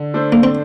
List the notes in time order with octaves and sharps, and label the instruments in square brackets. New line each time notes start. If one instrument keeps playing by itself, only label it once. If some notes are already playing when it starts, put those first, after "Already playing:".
Already playing: [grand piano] D3
A3 D4 A4 C5
[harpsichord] A#3
C4